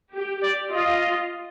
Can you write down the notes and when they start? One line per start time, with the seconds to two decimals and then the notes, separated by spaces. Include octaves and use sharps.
0.14 G4
0.43 D5
0.71 F4 D#5